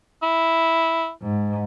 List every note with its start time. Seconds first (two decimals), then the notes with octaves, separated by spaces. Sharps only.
0.23 E4
1.23 G#2